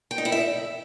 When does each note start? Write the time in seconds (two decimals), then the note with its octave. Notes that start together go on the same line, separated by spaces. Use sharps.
0.11 G5
0.18 D#4
0.25 E4
0.32 E5